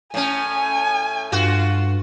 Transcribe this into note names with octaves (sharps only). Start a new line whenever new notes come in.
A2 C#4 G#5
G2 F4 F#4